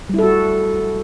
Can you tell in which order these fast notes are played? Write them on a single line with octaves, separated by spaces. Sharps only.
G3 E4 A4 F#4